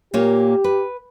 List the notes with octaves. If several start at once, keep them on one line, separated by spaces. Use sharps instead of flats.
A#2 A#3 G4 C#5
B4